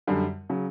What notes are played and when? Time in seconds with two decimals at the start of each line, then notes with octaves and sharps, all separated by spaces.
0.07 F#2 D3 G3
0.50 C#3 F#3